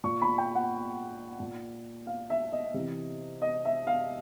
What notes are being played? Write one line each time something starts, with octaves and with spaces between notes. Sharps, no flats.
A#2 C#6
B5
G5
F#5
A#2
F5
E5
D#5
C3 E3
D#5
E5
F5